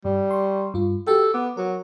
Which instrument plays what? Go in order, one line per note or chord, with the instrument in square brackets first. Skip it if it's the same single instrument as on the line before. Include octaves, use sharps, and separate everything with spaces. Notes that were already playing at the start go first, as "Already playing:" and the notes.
[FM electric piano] G2 [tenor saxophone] G3
[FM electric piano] C6 C#6
G2 F4
[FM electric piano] F#4 G4 G5 [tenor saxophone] A4
[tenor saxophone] B3 [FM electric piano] D6
[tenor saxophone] F#3 [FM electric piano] A#4